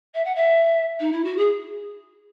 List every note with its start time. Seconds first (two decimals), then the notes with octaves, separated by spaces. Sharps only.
0.14 E5
0.24 F#5
0.35 E5
0.99 D#4
1.12 E4
1.24 F#4
1.37 G#4